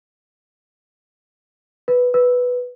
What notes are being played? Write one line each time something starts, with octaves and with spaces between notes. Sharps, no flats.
B4
B4